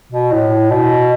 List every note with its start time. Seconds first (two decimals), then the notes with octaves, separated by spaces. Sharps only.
0.12 B2
0.32 A2
0.70 B2